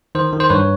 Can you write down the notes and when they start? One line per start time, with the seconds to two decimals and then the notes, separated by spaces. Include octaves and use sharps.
0.15 D#3 C5
0.33 D#3
0.40 C5
0.50 G2 B4 C#5